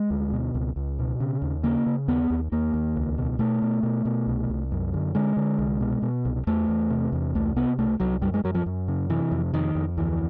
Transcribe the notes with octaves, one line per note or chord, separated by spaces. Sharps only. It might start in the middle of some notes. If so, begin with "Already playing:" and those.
Already playing: G#3
D2
B2
C#2
C#2
B2
C#3
D#2
C#3 A#3
C#3
D#2 B3
D#2
D#2 A#3
D#2
C#2
B2
B2 A3
B2
B2
B2
C2
C2
F#2
D3
D3 G#3
D3
C2
B2
B2
C2
E2 A3
E2
C3
E2
C2 A3
C3 B3
C2 A3
C2 F#3
F#2 G3
G#3
F#2 F#3
F3
F#2
C#3
C3 E3
F2
F2 D#3
F2
D2 E3